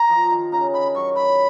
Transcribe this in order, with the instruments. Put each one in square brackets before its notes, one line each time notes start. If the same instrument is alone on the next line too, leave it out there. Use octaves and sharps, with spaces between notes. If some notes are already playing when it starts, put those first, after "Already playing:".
Already playing: [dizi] A#5
[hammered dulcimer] F3
D#3
[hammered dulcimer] C#3 [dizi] A#5
[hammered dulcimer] D#3 [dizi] B5
[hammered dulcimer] F#3 [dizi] C#6
[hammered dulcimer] F#3 [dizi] B5